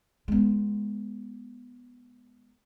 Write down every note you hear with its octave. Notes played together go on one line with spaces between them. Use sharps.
G#3 B3